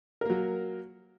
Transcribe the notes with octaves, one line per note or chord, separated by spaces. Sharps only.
F#3 A#3 A#4